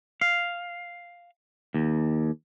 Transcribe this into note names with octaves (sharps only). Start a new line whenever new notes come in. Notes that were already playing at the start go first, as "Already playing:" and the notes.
F5
D#2